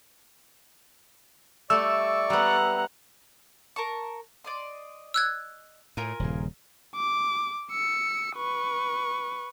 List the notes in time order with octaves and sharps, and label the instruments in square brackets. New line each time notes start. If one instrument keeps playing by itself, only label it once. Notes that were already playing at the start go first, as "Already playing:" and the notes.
[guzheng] G3 A3 [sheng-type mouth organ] D5 C#6 [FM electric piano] E6
[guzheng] G3 B3 [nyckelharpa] F#5 A#5
[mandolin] A#4 A5 C#6
D5 D#5 C6
[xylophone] E6 F#6 G#6
[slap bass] A2 [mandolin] F4 A#4 G#5
[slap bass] D#1 G2 C#3
[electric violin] D6
E6 C#7
B4 C#6